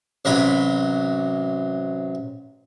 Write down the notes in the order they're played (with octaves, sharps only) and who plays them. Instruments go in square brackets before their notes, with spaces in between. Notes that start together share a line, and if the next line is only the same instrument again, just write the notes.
[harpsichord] A1 C3 F#3 A#5 B5